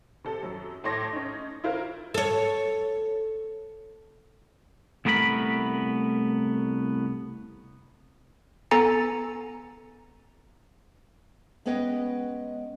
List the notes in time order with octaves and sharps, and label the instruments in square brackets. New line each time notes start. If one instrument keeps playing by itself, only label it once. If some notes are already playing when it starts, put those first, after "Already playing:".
[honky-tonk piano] C3 A4
F#2 F#3
A2 A3 C#5 C6 D6 A#6
C#4 D#4
E4 F4 A#4 C5
[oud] A4 C#5
[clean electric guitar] C2 A3 B3 A#4 D#5 B5
[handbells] B3 A4 G#5 A#5 A6 C#7
[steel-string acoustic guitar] G#3 B3 C#4 B4 D#5 G5